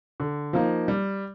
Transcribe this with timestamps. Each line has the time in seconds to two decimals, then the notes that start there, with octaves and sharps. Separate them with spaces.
0.20 D3
0.53 F3 A#3 D#4
0.88 G3